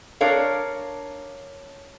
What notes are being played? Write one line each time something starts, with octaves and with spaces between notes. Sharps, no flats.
D4 A#4 C#5 F5